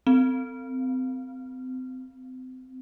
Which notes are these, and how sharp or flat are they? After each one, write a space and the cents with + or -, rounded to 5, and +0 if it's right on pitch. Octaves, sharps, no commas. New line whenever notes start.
C4 -25